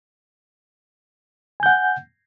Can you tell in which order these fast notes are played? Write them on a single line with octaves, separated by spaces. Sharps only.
G#5 G6 F#5